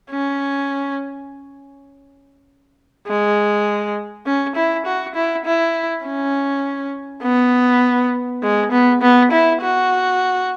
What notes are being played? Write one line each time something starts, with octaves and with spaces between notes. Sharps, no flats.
C#4
G#3
C#4
E4
F#4
E4
E4
C#4
B3
G#3
B3
B3
E4
F#4